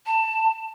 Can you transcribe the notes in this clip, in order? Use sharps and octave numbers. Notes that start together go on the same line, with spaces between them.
A5